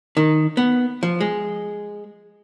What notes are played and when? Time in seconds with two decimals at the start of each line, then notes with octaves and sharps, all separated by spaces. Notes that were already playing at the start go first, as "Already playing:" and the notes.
0.17 D#3
0.57 B3
1.03 F3
1.21 G#3